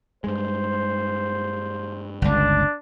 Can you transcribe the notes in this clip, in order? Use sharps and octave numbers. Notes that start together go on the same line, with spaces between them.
G2 G#3 C5
G1 C#2 D4